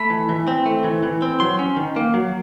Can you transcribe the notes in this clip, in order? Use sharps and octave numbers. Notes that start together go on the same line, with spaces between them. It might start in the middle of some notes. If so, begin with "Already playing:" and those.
Already playing: A3 B5
E3
E3
C4
A3
E3
E3
C4
F#3 C6
C#4
D#3
A#3
F#3